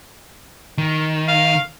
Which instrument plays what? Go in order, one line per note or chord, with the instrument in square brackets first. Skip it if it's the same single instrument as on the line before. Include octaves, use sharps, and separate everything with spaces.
[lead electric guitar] D#3
[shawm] F5